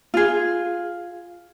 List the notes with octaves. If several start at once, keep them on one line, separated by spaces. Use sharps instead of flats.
F4 G#4